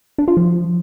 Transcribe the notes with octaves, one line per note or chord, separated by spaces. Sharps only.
D4
F4
F3